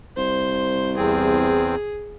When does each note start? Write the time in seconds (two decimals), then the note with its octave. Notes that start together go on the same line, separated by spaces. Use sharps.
0.17 C2 C5
0.97 E2 C4 G#4